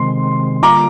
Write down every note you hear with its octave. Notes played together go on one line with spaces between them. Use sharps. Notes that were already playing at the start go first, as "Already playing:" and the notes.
Already playing: C3 D#3 G#3 C4 C6
D3 G3 A#3 F4 A#5 D6